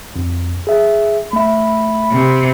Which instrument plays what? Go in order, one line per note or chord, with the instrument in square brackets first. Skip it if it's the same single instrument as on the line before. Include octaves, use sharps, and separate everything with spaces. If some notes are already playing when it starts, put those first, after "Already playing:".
[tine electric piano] F2
G#4 E5
[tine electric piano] A3 E5 [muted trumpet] B5
[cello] C3